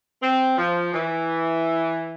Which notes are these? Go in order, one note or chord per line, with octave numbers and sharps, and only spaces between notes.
C4
F3
E3